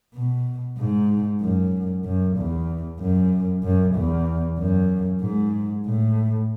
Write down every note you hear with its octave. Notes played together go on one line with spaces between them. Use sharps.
B2
G#2
F#2
F#2
E2
F#2
F#2
E2
F#2
G#2
A2